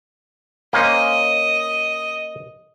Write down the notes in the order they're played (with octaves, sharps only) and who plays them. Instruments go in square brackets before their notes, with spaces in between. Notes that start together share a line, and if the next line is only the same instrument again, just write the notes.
[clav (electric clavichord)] A#3 C#4 C5 [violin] D#5